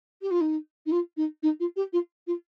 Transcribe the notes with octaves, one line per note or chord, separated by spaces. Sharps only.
G4
F4
D#4
D#4
F4
D#4
D#4
F4
G4
F4
F4